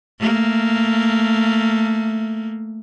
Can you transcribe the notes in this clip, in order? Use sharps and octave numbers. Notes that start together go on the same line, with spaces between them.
A3 A#3